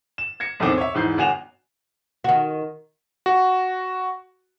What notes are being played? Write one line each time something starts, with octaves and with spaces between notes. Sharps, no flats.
E7
G#6 A#6 C#7
B1 E2 A2 D#3 C4 D6
C#5 E5
E1 G#2 E3 G6 C7
G1 F#4 G#5 E7 F7
D#3 F#4
F#4